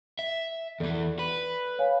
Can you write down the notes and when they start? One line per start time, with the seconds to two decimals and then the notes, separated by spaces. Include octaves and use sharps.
0.19 E5
0.80 E2 E3 A4 D5
1.19 B4
1.79 C#5 F5 G#5